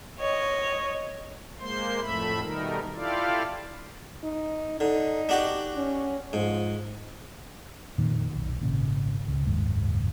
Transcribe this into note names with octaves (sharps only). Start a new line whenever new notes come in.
C#5 D#5
G#3 A#3 C5 C6
F2 A2 A3 E5 B5
B2 D#3 G3 A3 D#4 A#4
E4 F4 G4 A4 D5 F5
D#4
D3 D#4
D4 F#4 G4
C#4
G#2 F3
F2 A#2 D#3
B1
G#1 A#2 C#3
C#2
F#1 D#2 G#2